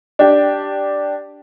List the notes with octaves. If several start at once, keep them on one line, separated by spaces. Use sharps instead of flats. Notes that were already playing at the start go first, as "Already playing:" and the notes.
D4 G4